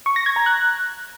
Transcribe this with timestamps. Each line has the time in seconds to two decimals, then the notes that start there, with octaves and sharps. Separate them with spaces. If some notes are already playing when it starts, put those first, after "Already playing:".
0.06 C#6
0.16 A#6
0.26 G#6
0.36 A#5
0.46 F#6